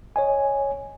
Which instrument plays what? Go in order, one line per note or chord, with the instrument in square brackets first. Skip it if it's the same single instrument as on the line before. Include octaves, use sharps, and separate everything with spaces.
[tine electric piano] C#5 D#5 G#5